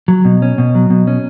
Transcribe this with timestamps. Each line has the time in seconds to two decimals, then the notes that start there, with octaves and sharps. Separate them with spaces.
0.08 F#3
0.25 B2
0.42 C#4
0.58 B2
0.75 F#3
0.90 B2
1.07 C#4